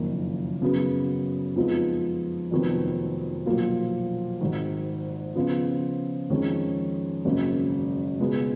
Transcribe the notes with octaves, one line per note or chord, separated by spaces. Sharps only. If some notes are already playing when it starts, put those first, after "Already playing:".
Already playing: F#1 F2 D#3 A#3
F#2 C#3 F#3 B3
F2 F3 G#3 B3 D#4
F1 F2 D#3 F#3 B3
B1 A#2 F3 A#3 F4
G#1 G#2 D#3
C#3 F3 B3 F4
F2 D#3 G#3 C#4
G#1 F#2 C#3 F#3 A#3
C#2 B2 G#3 B3